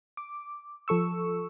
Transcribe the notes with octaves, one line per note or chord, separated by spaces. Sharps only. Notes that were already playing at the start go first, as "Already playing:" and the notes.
D6
F3 A4 C#6 E6